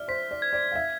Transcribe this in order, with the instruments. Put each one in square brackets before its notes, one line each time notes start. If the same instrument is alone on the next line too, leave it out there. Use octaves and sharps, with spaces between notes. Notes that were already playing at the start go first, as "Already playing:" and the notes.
Already playing: [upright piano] D5 E5 [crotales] F6
[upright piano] C5 [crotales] B6
[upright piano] D5
[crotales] G#6
[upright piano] D5
F5
[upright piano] E5 [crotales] G#6